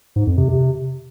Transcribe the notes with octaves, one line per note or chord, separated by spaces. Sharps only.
G#2
F2
C3
C3